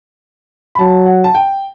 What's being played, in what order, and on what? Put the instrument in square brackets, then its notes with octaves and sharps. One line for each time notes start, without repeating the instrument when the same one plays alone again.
[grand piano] B5
[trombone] F#3 [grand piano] A5
[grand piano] F#5
A5
G5